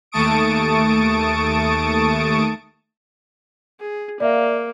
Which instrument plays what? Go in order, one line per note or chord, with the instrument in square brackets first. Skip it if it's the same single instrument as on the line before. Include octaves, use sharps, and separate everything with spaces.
[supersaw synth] D#2 A3 A5 C#6 D#6 D7
[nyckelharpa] G#4
[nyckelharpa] A#3 [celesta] D5 E5 F5